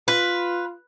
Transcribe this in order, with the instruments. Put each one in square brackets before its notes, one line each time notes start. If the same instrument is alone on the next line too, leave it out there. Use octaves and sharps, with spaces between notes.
[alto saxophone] F4 [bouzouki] B4